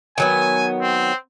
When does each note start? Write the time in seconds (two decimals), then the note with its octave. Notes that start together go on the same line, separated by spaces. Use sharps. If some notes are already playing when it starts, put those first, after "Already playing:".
0.18 D#3 F#3 B3 G#5
0.81 C4